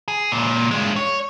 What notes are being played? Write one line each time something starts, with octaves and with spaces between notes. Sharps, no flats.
G#4
C#2 A#2
G2 G#3
C#5